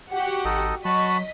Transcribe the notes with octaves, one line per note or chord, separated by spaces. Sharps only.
F#4 G4 F#5
G#1 D#4 A4 D#5
F#3 F#4 D#5 A5 B5 C#6 B6